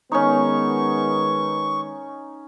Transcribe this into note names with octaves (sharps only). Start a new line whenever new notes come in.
D#3 G#3 B3 C#4 D#4 C#6